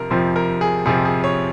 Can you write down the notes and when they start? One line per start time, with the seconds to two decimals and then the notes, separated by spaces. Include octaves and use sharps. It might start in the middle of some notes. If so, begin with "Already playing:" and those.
Already playing: F2 C3 F3 A#4
0.10 F2 C3 F3 C5
0.36 A#4
0.61 G#4
0.86 F2 C3 F3 G#4
1.05 G#4
1.24 C#5